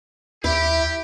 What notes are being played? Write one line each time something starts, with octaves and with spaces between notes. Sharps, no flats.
D#2 E4 G4